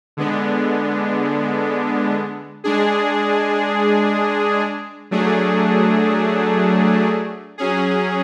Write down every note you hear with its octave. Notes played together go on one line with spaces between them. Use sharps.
D3 G#3 B3 D4
G#3 D4 G#4
F#3 A3 D4 G#4
F#3 C#4 G#4